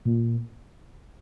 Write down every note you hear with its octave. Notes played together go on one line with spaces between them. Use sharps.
A#2